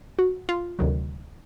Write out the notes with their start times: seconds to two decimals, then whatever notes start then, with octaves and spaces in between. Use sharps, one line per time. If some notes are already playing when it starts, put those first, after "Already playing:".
0.19 F#4
0.49 F4
0.79 D2 C3 D#3 F#3